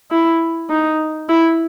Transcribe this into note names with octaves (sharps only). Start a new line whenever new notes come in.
E4
D#4
E4